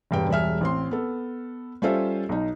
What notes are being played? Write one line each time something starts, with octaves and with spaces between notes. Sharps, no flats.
E1 G2 G5
E1 G3 G#4 E5 F6
A1 C4 C6
B3 A4
G3 C#4 F4 A4 C5 E5
B1 D#4